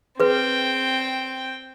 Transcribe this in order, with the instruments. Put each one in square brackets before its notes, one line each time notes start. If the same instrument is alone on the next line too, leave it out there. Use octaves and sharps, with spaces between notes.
[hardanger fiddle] C4 G5 [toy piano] G#4 B4